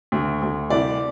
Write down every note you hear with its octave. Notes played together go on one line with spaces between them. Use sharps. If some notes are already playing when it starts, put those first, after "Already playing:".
D2
D2
C2 D5